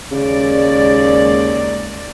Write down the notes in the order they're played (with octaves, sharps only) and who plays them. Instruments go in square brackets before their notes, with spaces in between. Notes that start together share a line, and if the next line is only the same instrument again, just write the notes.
[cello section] D#2 G#3 D5 [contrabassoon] C#3